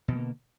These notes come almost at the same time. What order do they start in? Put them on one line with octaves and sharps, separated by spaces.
B2 E3 A#3 D3